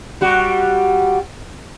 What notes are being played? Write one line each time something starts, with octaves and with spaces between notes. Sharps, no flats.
G3 F#4